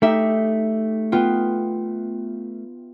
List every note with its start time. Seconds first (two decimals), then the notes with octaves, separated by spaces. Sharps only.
0.02 A3 D#4 G4 E5
1.12 B3 F4 G5